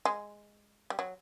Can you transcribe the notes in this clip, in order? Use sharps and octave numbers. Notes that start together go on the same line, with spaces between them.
G#3
G3
F#3